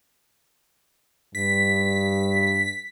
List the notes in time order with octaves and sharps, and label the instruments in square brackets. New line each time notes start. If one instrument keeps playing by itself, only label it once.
[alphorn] G2 [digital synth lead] B6